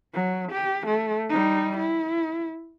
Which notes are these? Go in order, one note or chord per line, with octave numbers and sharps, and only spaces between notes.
F#3
G4
A3
G3 D#4
E4